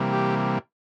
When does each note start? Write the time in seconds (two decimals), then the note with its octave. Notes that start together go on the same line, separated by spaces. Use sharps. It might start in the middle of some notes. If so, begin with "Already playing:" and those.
Already playing: C3 E3 G3 A#3
0.13 G4